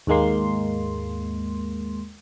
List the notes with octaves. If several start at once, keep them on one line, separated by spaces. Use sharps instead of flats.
D#2 G#2 G#3 A#3 C6